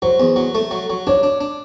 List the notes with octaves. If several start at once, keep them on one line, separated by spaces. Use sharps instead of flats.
F#3 C5
E2
F#3
A3
F#3
F#3
D4 C#5
D4
D4